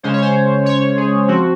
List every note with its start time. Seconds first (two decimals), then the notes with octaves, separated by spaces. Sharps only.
0.03 C#3 G#3 C#4 C5
0.13 C#5
0.22 C5
0.66 C#5
0.97 G#4
1.28 F3 C4 F#4